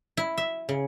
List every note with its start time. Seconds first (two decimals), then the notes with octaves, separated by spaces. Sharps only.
0.17 E4
0.37 E5
0.69 C#3